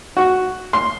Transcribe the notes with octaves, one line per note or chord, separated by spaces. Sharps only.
F#4
C6